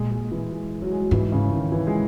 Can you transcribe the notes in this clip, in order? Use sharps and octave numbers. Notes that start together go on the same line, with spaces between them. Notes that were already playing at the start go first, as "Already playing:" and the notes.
Already playing: A#2 G#3
G#3
E3
G#3
F#3
G#3
F#3
G#2 E3
C#3
D#3
E3
G#3